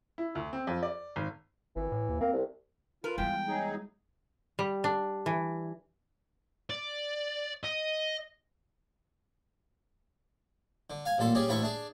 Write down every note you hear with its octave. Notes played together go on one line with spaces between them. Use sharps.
E4
D2
C4
F2
D5
G#1
G#1 E3
A2
D#2
A#3 C4
C2
F4 A#4 B4
E2 G3 G#3 G5
F#3 D#4 G#4
G3
D4
E3
D5
D#5
D3
F5 G#5
A1 A#2 A4 C6
G3 C#4 G#4 D5
A1 D2 E4 A4 B5 C#6
D4 G#4